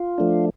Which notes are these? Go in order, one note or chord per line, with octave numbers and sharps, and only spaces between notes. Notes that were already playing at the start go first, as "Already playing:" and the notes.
Already playing: F4
F3 A3 D4